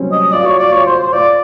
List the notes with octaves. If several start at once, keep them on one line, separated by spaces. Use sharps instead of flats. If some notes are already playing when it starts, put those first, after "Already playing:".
Already playing: F#3 G3 C4 C#4
D#5
F4 D5
F#4 C#5
F4 D5
F4 C#5
C5
C5
F4 D5